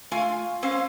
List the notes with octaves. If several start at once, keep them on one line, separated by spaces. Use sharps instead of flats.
A3 F4 F5 G#5
C4 C#4 C5 F5